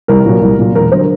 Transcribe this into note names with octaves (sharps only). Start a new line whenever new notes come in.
C2 A#4
A#2 F#3
C2
A#2 F#3
E1 A#4
D3 F#3 C5